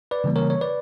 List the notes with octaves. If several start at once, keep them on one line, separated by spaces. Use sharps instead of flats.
B4 D5
C#3 E3 G3 A#3
A#4 C#5
C#5
B4 D5